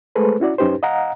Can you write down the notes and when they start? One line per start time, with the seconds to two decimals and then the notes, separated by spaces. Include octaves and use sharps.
0.15 G#3 A3 G#4 A4 B4 C5
0.40 C#4 E4 F#4 D5
0.58 F#2 C#4 D#4 G4 B4 C5
0.83 D#5 F5 F#5 A#5